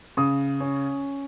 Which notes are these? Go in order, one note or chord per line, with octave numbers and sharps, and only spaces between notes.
C#3 D#6
C#4